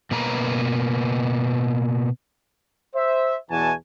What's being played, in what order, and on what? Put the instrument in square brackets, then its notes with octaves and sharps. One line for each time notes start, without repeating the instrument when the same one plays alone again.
[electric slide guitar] B2 A#3 B4 A#5
[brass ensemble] C5 E5
E2 B2 E3 F#4 G#5 A5